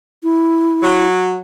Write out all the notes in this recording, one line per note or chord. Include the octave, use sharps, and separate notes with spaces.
E4
F#3